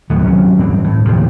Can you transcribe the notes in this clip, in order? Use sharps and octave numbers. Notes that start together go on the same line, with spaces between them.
D2 A2 D#3 F#3
C3 F#3 C#4
D1 G2 E3 C4
A2
E1 D#2 C3 F3